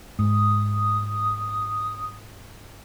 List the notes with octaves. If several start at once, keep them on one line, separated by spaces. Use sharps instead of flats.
G#2 D#6